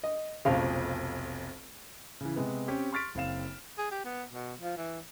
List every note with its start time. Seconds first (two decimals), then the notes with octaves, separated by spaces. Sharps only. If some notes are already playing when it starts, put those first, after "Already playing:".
0.04 D#5
0.45 F1 B1 F2 C#3 F5
2.21 C#3 E3
2.36 C3 G#3 B3
2.68 C4 C#4 G4
2.92 C6 C#6 F6 A6 B6 D7
3.15 F#1 C4 F5 E7
3.78 G#4
3.91 G4
4.05 B3
4.33 B2
4.61 F3
4.77 E3